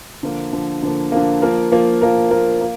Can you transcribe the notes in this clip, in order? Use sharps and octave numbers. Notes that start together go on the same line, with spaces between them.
D3 F3 A#3
D3 F3 A#3
D3 F3 A#3
D3 F3 A#3
F3 A#3 F4 A#4
F3 A#3 F4 A#4
F3 A#3 F4 A#4
F3 A#3 F4 A#4
A#3